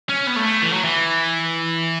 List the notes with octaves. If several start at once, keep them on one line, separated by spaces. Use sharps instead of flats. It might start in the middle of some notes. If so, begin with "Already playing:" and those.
C#4
B3
A3
E3
F#3
E3